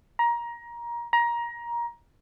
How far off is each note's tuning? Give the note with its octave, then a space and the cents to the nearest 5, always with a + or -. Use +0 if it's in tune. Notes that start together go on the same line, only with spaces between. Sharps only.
A#5 +20
A#5 +20